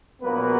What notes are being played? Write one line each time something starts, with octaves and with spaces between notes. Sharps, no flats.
A#1 A#2 F#3 A#3 B3 B4